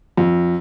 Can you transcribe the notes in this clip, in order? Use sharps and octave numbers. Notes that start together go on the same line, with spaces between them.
F2